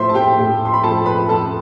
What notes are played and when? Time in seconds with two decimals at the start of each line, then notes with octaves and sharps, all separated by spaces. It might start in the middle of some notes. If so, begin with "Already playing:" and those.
Already playing: A2 F3 C5 E5 C6
0.09 A5
0.14 G4 G5
0.37 A2
0.65 C6
0.73 B5
0.84 F3 A4 A5
1.06 B4 B5
1.29 F3 A4 A5